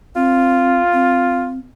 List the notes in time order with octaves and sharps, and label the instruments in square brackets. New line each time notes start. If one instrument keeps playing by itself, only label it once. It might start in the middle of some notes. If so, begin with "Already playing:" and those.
[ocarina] C4 [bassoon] F4
[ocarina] C4